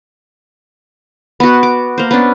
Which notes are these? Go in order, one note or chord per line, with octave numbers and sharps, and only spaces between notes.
B3 F#4
D6
A#3 C5
B3 C#4 D4